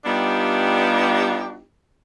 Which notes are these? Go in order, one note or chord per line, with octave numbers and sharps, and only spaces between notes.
G3 B3 D4 D#4 F4 G4